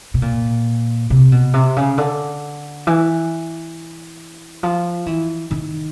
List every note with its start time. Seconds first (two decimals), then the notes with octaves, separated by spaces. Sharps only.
0.14 B2
0.22 A#2
1.10 C3
1.32 B2
1.54 C3
1.76 C#3
1.98 D3
2.87 E3
4.63 F3
5.06 E3
5.51 D#3